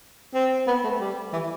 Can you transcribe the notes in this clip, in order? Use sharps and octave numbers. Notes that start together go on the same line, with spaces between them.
C4
B3
A3
G3
E3